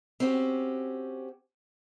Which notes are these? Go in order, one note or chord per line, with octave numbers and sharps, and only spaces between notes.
C4 C#4 F#4 G4